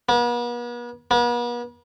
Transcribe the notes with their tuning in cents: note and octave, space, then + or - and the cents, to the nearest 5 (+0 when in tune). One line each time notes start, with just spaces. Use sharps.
B3 -45
B3 -45